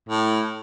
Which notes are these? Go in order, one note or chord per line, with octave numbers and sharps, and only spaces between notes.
A2